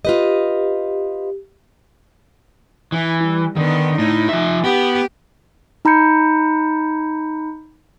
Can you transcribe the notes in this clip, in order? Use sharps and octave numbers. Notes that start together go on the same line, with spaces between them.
F4 G4 B4 D#5
E3 E4
G3
D3 D#3 B3
A2 D#4
F3 E5
B3 G4
D#4 A#5 B5 G6 C#7